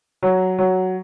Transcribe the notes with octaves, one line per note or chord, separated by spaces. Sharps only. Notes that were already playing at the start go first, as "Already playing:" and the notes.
F#3
F#3